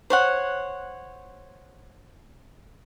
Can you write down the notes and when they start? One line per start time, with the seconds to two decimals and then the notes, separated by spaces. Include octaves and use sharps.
0.10 C5 C#5 F#5